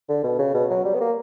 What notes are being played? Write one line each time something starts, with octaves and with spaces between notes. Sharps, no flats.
D3
B2
C#3
B2
F#3
G3
B3
A#3